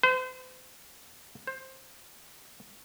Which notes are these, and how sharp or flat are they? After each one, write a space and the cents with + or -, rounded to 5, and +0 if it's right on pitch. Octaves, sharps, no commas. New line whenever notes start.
C5 -40
C5 +15